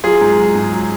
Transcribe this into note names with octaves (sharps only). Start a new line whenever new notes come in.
F#3 F4 G#4
G#2
F#3
G#2
F#3